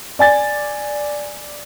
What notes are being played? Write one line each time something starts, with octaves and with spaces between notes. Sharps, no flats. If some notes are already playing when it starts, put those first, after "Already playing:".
D5 G#5 A6